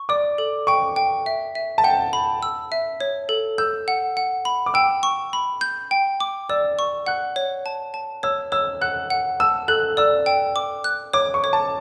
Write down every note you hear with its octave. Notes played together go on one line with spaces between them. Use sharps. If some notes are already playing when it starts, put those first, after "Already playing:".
Already playing: C#6
D5 D6
A4
G5 C#6
G5
E5
E5
A5
F#5 G5
B5
E6
E5
C#5
A4
E6 G6
F#5
F#5
B5
D6
G5 E6
C#6
B5
G6
G5
D6
D5 E6
C#6
F#5 F#6
C#5
A5
A5
C#5 E6
C#5 E6
F#5 F#6
F#5
A5 E6
A4 F#6
D5 E6
G5
D6
F#6
C#5 D6
C#6
C#5
A5